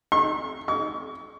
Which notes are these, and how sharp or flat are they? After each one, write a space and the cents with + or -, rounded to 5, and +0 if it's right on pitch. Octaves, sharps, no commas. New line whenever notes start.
C#6 -40
C#6 +35